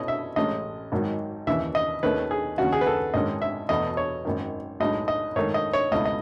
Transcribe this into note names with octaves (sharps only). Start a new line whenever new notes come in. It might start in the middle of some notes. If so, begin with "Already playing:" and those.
Already playing: B2 A3 C#4 E4 D#5
E5
A1 A2 G#3 C#4 D#5
G#1 G#2 D#3 F#3
D#2 C#3 E3 E5
D#5
D#2 D#3 A3 C#4 B4
G#4
D#2 C#3 F#3 F#4
G#4
B4
A4
G#1 G#2 D#3 G#3 C#4 D#5
E5
E2 B2 A3 D#5
C#5
G#1 F#2 D#3
B1 A2 G#3 D#4 D#5
D#5
G#2 D#3 A3 D#4 C#5
D#5
C#5
C#2 B2 A3 E4 D#5
D#5